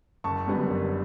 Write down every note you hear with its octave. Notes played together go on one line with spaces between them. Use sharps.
F#1 A5 C#6
F#2 D3 G3 B3
F#1